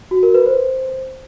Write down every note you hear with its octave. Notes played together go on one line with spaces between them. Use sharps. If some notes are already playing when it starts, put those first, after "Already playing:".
F#4
A#4
B4
C5